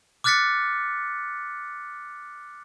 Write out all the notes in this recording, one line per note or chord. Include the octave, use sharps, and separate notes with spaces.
D6 F6 F#6 A6 B6 C#7